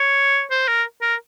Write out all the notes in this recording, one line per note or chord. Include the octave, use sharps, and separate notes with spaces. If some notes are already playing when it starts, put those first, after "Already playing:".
Already playing: C#5
C5
A#4
A#4